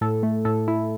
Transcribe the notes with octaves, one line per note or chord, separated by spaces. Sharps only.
A2 A4
A3
A2 A4
E4